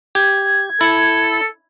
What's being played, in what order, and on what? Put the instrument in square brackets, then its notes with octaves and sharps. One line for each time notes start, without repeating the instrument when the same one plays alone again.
[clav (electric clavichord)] G4 [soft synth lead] G#6
[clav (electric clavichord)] E4 [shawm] A4